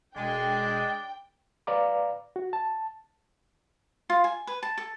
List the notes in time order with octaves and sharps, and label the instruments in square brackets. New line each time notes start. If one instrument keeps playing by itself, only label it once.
[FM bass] E1 [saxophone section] G#3 [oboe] D4 [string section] G5
[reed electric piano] B4 D5 F5 A#5 D6
F#4
A5
[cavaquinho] F4
G#5
B4
A5
A4